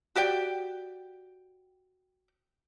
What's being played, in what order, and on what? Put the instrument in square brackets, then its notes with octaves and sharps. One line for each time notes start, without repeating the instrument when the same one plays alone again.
[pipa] F#4 G4 D5 G5